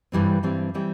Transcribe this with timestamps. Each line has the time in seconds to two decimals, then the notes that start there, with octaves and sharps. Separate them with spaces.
0.12 G2 E3 G3 C4
0.43 G2 E3 G3 C4
0.74 E3 G3 C4